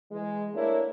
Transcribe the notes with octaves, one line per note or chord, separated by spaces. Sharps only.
E3 G#3
A3 A#3 D4 E4 A#4 C#5